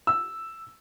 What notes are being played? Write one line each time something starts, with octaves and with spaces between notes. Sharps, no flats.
E6